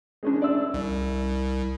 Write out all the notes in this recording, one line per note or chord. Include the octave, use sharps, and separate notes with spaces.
G#3 C#4 D4
D5 E5 E6
C2